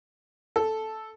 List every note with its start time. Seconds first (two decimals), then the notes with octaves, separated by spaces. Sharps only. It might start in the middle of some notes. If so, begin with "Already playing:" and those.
0.56 A4